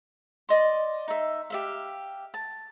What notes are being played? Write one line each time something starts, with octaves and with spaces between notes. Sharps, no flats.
D5 D#5 C6
D#4 E5
G4 E5 F5
A5